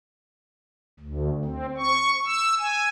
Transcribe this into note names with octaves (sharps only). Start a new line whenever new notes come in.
D2
C4
C#6
E6
G#5